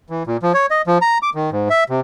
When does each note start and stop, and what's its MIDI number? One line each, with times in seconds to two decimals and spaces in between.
0.10 0.23 52
0.27 0.37 46
0.43 0.53 53
0.54 0.66 73
0.70 0.82 75
0.87 0.98 53
1.02 1.18 82
1.22 1.30 86
1.35 1.50 51
1.52 1.68 44
1.70 1.84 76
1.90 2.00 48